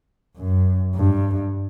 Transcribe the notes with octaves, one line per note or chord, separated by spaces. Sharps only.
F#2
G2